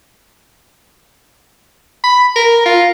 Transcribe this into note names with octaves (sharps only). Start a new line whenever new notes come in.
B5
A#4
F4